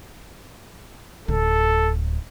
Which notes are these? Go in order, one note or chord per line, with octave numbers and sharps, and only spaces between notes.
D1 D3 A4